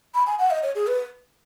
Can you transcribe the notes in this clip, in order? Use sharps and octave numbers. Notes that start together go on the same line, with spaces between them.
B5
G#5
F#5
D#5
C#5
G#4
B4